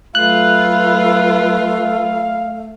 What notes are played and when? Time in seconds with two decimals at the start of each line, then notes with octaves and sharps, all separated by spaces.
0.15 F#3 A3 F4 B4 F5 F#6